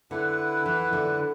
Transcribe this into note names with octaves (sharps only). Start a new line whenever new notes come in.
D3 E4 B4 F#5
E3
D3